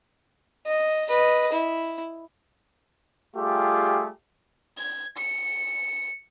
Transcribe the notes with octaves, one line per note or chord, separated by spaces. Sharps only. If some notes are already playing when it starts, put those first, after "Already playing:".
D#5
B4 D#5
E4
G3 A3 F4 G4 G#4
G#6
C#7